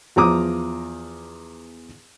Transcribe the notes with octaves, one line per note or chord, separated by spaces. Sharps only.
E2 F3 A#5 D6 D#6